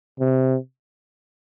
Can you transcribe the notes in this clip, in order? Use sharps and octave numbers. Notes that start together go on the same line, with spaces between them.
C3